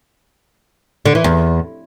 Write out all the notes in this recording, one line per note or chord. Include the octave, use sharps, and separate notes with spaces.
D3
E3
E2